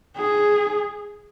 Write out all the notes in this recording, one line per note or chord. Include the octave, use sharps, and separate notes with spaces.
G#4